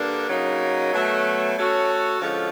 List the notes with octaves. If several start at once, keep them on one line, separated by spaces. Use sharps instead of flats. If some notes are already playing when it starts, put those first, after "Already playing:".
Already playing: G2 D3 A#3 D4
C#3 F#3 A#3 D#4
B2 F#3 A3
A3 C#4 F#4 A4 C#5
D3 F3 G#3 C#4